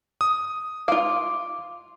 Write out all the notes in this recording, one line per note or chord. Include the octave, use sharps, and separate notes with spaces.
D#6
F4 F5 D6